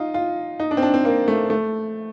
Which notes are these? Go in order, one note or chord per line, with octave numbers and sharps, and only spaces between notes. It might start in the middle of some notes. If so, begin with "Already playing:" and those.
Already playing: D#4 F4
F4
D#4
D4
C4
D4
C4
A#3
A3
A3